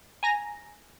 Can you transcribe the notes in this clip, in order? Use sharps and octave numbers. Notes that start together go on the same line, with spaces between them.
G#5 A#5 A#6